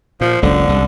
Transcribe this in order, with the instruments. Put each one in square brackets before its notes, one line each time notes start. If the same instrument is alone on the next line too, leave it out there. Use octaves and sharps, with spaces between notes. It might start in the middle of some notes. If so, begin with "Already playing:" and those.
[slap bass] A#2 [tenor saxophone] F3
[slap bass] F#1 C#2 [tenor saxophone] D3
[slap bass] C2